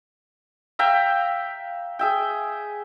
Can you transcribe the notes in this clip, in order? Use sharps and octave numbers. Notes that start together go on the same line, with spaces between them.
E5 F5 G5 A#5
G#4 E5 G5